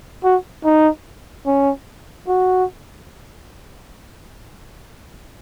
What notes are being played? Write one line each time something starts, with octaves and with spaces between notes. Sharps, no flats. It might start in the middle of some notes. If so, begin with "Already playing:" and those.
F#4
D#4
C#4
F#4